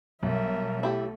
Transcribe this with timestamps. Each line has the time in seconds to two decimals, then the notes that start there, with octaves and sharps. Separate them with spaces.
0.23 B1 F#3 G3 A#4 E5
0.83 A3 E4 G4